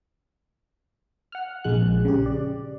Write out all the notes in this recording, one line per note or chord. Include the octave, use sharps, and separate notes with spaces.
F#5 F6
A#1 F2 G#3 F#6
C#3 G4
D5